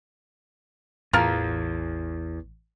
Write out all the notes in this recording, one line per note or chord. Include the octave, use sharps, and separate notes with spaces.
A1 E2 F4 A#4 A5